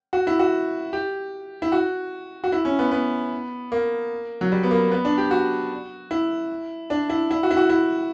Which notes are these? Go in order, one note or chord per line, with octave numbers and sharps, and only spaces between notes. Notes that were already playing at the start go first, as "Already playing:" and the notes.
F#4
E4
F#4
G4
E4
F#4
F#4
E4
C#4
B3
B3
A#3
F#3
G3
B3
A#3
B3
D4
G4
F#4
E4
D4
E4
E4
F#4
E4
F#4
E4